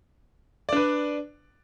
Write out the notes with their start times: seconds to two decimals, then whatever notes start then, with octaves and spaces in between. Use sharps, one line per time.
0.69 D5
0.73 D4
0.76 B4